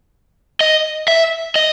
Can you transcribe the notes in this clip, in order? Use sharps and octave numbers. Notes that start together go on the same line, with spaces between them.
D#5
E5
D#5